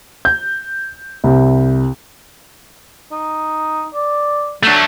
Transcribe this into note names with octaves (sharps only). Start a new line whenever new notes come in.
G6
C2
D#4
D5
F#3 A3 D4